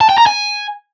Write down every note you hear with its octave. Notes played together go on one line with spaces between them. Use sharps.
A5
G5
A#5
G#5